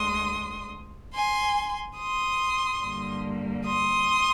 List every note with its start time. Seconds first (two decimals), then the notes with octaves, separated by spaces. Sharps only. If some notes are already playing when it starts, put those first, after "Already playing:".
Already playing: D2 D3 G#3 C6 D#6
1.14 G#5 C6
1.97 C6 D#6
2.81 G2 D3 G3 A#3
3.65 C6 D#6